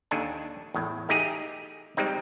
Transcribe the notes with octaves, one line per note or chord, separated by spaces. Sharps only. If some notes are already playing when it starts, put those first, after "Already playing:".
D#2 D4 A4 G#5
E2 A2
A3 D#4 G4 G#4
G3 G#3 C4 D#4